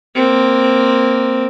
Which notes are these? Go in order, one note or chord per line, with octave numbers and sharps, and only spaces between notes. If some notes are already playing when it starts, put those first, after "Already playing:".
A#3 C4